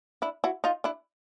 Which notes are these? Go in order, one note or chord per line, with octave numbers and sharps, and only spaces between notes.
D4 E4
E4 F#4
D#4 F4
D4 E4